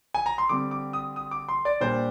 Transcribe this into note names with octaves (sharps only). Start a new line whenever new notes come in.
G#5
A#5
C6
D3 G3 C4 D6
D6
D#6
D#6
D6
C6
D5
A#2 G3 D4 C5